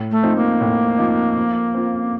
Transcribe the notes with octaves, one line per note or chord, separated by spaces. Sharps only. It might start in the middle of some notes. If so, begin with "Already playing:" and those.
Already playing: A2
A3
F3 C4 D#4
A#3
A2
F3 C4 D#4
F3
C4 F4